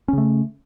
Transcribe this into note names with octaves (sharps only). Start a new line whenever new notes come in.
C#3 A3 C#4